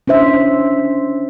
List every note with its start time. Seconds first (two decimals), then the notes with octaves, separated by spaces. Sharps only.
0.07 C#4 D4 C5 E5